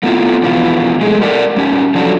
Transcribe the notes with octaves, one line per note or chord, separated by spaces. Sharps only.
A3 B3 C4 E4 F4 A4
F2 B2 E3 F4
G#3 A3 G#4
G4 A4 A#4 D5 E5 F#5
G3 C#4 G4
F3 F#3 D4 F#4 A4